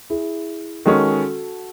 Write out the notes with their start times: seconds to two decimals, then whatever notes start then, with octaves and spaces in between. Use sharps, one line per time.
0.10 E4 G#4
0.86 D#3 G#3 C#4 F#4 A4